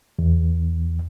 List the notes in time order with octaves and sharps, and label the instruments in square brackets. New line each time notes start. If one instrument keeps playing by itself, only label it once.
[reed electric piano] E2